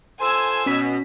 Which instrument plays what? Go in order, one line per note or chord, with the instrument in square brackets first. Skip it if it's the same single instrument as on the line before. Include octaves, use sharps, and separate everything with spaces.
[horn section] F4 A4 C5 [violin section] G#5 E6 G#6
[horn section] B2 [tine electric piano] C#4 B6